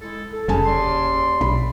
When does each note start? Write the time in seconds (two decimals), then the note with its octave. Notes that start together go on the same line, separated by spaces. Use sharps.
0.01 G#3 E4 A4
0.32 A4
0.48 F1 C#3 G#5 A5
0.65 D#2 D5 C6
1.41 B1 B5